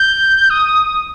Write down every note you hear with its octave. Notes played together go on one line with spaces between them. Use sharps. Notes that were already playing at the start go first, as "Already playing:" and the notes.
Already playing: G6
D#6